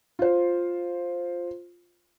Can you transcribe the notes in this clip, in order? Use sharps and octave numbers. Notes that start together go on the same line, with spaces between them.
F4 C5